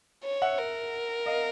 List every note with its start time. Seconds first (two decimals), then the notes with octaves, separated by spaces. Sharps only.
0.24 C#5
0.42 E5 F#5
0.59 A#4
1.26 D#5 F5